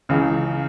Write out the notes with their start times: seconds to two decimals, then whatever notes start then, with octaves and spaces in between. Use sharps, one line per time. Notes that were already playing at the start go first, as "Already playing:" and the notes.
0.09 C#2 C#3 E3